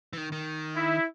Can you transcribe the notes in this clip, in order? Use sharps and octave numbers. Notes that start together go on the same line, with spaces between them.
E3
D#3
D#3
E4